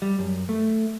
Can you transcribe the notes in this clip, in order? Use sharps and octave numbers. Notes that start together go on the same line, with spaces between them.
G3
F#2
A3